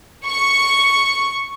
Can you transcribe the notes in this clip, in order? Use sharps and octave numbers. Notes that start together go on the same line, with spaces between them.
C#6